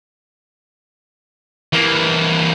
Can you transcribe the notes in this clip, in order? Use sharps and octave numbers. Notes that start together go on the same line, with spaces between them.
E3 A#3